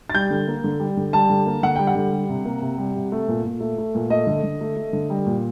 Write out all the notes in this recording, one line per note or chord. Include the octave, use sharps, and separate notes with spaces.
A6
G3 G6
D3
A#3
D3
G3
D3
G3 A5
D3
A#3
D3 F#5
G3 G5
F#5
D3
G3
C3
A#3
C3
G3
C3
A3
A#2
A#2
A3
A3
A#2
A3 D#5
D3
D3
A3
A3
D3
G3
A#2